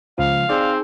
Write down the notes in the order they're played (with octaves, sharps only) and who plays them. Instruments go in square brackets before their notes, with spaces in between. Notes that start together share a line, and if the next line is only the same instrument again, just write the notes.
[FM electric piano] C#2 F3 [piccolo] F5
[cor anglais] C4 [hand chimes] D#4 G#4 [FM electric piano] D5